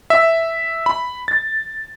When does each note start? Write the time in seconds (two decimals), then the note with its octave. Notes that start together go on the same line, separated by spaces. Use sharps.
0.10 E5
0.86 B5
1.28 A6